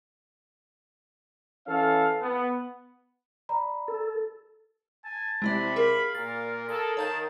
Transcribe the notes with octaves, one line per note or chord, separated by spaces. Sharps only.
E3 C#4 A4 F5
B3
D5 A#5 B5
A4
G#5 A5
C3 G#3 E4 D5 B5
G#4 A#4 F5 B5
A#2 A#4 A6
G#4 A4 A#6
D#3 C#5 F5 A5 G6